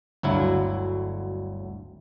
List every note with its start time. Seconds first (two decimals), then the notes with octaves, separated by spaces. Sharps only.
0.23 G1 D2 F#3 E4